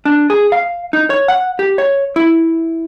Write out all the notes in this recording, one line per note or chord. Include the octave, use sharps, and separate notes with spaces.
D4
G#4
F5
D#4
C#5
F#5
G4
C#5
E4